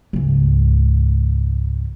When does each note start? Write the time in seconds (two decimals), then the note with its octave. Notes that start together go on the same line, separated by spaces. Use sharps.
0.13 C#2 G#2